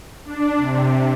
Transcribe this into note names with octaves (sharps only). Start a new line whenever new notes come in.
D4
C3